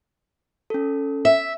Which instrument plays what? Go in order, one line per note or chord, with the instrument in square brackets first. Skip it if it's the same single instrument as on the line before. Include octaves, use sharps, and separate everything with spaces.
[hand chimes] C#4 A4
[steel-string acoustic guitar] E5